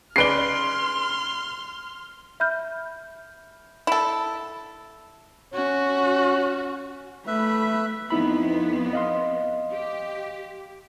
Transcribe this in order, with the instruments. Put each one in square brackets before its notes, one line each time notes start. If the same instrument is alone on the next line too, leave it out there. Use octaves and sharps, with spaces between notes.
[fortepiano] C#3 B4 D5 [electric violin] C6 F6 [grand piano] C7 D7 G7
[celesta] E5 B5 F6 G6
[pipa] E4 A4
[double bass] C#4 [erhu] F#4
[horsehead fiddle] A3 B5 [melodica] B4 E5
[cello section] F2 B3 [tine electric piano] D#4 E4 B5
[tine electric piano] D#5 F5 C6
[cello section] G4